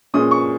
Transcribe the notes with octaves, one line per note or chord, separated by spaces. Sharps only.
A#2 G#3 C#4 D#6
C#6